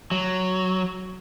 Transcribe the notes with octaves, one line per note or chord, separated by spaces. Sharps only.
F#3